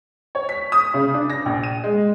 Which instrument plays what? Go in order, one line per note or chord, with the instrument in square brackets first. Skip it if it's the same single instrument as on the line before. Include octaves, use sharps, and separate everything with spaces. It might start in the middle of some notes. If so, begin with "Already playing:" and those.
[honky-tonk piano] C#5
B6
D#6
C#3
D4
A#6
A#1
D#7
G#3